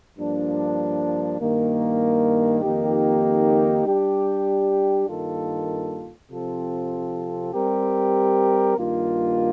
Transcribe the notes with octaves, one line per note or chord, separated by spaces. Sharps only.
G2 F3 A#3 D4
G2 D#3 A#3
F2 D#3 A#3 D#4 G4
G3 D4 G4
G2 D#3 A#3 F4 A4
C3 F3 C4 F4 A4
G3 C4 G4 A#4
G2 D#3 A#3 F4